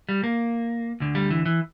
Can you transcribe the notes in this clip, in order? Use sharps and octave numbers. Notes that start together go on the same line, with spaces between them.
G3
A#3
D2 D3
G3
E3
E3